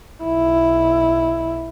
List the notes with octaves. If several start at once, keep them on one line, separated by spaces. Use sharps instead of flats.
B1 E4